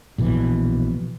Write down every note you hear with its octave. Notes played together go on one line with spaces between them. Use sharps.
A#1 B2 E3